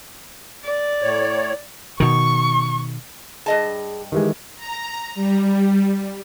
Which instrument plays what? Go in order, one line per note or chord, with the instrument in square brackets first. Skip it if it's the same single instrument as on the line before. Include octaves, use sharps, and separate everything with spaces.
[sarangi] D5
[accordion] A2 C#5
[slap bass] B2 D#3 [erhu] C#6
[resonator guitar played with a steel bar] G2 D#5 A5 [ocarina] G#4
[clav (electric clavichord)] D#3 E3 G#3 [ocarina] G4
[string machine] A#5
G3